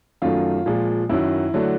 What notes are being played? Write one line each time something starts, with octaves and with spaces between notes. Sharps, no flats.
F#2 D#3 F#3 A3 F4
A#2 F3 G#3
F#2 D#3 F#3 E4
D3 F#3 A3